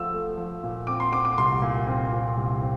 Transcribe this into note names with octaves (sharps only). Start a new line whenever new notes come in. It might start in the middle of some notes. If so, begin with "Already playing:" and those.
Already playing: F3 A3 E6
A3
F3
A#2
C4 D6
C6
C4 D6
D6
C2 C6
A#2
C4
A#2
C2
C4